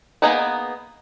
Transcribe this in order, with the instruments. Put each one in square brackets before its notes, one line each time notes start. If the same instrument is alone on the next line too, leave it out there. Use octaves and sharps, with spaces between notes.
[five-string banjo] A#3 B3 D#4 G#4 B4